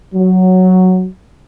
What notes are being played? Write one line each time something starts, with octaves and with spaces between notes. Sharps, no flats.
F#3